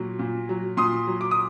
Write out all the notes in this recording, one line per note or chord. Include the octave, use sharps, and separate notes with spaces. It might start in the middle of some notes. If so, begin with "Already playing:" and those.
Already playing: A#2 F#3
A#2
F#3
A#2 C6 D#6
F#3
D6
D#6